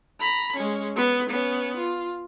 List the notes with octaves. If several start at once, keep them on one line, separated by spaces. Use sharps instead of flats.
A#5 B5
G#3 C#4
B3
B3 C#4
F4